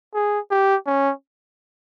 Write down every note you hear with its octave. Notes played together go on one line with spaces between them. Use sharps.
G#4
G4
C#4